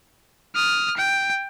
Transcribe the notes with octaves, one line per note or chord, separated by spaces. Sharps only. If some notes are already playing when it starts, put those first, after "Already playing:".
D#6 F6
G5